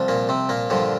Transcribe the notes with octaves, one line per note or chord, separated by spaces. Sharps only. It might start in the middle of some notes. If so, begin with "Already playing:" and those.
Already playing: C2 F3
A#2 A#3
C3 C4
A#2 A#3
G2 D3 F3